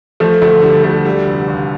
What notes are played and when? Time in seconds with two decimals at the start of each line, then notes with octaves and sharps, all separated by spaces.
0.20 F3 A3
0.42 D2 A3
0.62 D3 G3
0.84 D2 A3
1.05 D3 G3
1.26 F1
1.48 D#2